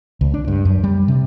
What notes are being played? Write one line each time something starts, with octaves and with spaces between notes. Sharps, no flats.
C#2
D4
G2
F#2
G3
C3